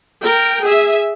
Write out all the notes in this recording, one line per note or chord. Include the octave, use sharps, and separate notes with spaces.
A#4 G5
G#4 E5